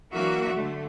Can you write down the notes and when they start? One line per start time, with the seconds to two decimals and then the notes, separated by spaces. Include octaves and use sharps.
0.13 E3 F#3 A#3 D4 F#4 E5
0.55 D3 A3